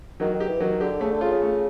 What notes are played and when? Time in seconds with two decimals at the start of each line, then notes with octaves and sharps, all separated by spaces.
0.20 D#3 F#3
0.33 D#3
0.40 G4
0.47 E3
0.60 D#3 F#3
0.80 D3 G4
1.01 C#3 A3
1.11 D3
1.21 C#3 F4
1.31 C#3
1.41 A3